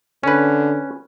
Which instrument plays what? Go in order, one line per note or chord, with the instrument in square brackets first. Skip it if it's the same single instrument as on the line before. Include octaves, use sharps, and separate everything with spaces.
[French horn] D3 [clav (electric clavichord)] C#4 B4